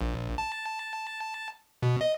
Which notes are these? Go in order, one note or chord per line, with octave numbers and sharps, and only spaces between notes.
A#1
A5
B2
D#5